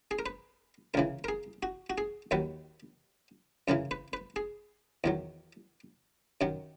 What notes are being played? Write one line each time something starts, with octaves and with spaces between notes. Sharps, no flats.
G#4
A#4
B4
C#2 C#3 E3 A#4
A#4
G#4
F#4
F#4
G#4
D#2 D#3 F#3 B4
F#2 C#3 E3 A#4
B4
B4
G#4
E2 D#3 F#3
F#2 D#3 F#3